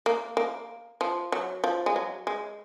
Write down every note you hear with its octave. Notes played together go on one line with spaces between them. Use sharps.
A#3
A#3
F3
F#3
F3
G#3
F#3
G#3